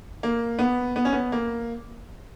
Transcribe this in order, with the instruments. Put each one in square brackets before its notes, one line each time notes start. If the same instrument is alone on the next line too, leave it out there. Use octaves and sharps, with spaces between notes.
[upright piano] A#3
B3
B3
C#4
B3
A#3